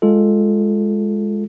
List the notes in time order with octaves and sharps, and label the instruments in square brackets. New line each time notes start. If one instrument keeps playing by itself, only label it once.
[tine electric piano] G#3 F4 A4